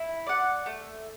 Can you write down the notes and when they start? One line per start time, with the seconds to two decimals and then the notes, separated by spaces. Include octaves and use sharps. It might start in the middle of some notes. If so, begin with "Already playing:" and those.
Already playing: E4
0.27 D5 F#5
0.66 A3